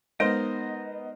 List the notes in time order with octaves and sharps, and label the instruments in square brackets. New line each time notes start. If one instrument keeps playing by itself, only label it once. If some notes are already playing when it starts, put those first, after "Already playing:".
[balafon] G#3 [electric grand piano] B3 D#4 [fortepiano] A#4 C5 C6 [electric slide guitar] D#5